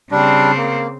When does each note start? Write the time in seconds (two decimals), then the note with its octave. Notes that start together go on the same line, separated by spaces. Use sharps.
0.12 C#3 G3 C4 D4
0.57 A#3